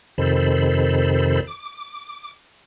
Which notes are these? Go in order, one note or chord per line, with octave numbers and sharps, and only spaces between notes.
F2 C3 D#3 A4 C5 B5
D6